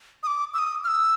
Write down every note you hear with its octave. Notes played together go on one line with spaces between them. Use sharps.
D#6
D6
E6
D#6
F6
E6